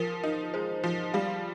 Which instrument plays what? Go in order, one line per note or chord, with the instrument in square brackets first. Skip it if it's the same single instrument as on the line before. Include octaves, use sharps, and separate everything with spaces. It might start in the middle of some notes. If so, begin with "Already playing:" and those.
Already playing: [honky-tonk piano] F3 [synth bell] A#4
[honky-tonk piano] D#4
[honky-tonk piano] G#3 [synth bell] C5
[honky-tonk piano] F3
[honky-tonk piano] G3 [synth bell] F5